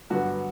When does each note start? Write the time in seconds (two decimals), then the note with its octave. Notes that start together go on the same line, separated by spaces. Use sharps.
0.10 G2 D3 F#3 B3 F#4